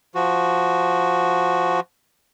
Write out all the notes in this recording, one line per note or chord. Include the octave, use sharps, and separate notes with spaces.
F3 F#4